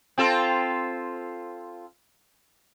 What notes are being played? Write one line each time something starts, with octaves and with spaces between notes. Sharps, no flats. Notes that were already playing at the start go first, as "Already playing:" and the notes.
C4 F4 A4